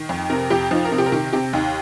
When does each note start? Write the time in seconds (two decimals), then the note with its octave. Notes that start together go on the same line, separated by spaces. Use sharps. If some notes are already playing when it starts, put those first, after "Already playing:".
Already playing: D#3
0.09 F2
0.30 C3 A#4
0.50 F2 G4
0.71 F3 D#4
0.85 A#4
0.92 C3
0.98 G4
1.06 A#4
1.12 D#3 G4
1.33 C3 G4
1.53 D#2 D#4